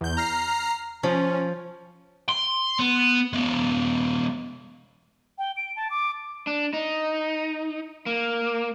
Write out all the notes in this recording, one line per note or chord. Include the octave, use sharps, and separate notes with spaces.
E2 G6
A#5 F6 C7
F3 C#4
C6
B3
G#3 B3
G5
D7
A5
D6
D4
D#4
A#3